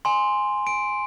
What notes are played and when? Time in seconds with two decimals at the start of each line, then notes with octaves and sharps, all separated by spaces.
0.05 G#5 C6
0.67 D7